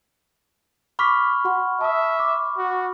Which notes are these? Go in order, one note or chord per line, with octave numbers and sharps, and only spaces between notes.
B5 C#6 D6 F6 B6
F#4 F#5 C6
E5 A5 D#6
D6
F#4